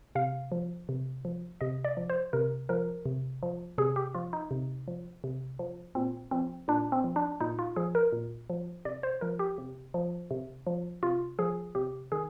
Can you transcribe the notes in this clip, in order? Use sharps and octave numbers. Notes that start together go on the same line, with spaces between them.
C3 F5
F3
C3
F3
C3 D#5
D5
F3
C5
C3 A#4
F3 A#4
C3
F3
C3 G#4
G4
F3 F4
D#4
C3
F3
C3
F3
A#2 C4
F3 C4
A#2 D4
C4
F3
D4
A#2 D#4
F4
F3 G#4
A#4
A#2
F3
C3 D5
C5
F3 A#4
G4
C3
F3
C3
F3
C3 F4
F3 G#4
C3 G4
D#3 G#4